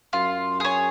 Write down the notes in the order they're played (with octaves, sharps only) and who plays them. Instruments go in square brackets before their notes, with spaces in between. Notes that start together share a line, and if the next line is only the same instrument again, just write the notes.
[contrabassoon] F#2 [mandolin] F4
[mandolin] G#4 C#5